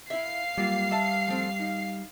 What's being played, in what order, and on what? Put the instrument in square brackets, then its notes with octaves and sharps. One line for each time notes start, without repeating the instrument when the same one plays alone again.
[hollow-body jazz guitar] E4 E5 [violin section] F5 C7
[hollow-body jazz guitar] F#3 A#3 F4 [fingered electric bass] G3
[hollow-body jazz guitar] E5 A5
F3 A3 C4
D#4